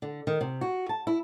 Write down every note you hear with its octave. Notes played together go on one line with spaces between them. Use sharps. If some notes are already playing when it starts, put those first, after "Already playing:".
D3
D#3
C3
F#4
A5
E4